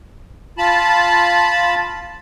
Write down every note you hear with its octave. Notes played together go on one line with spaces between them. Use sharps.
F4 A5 B5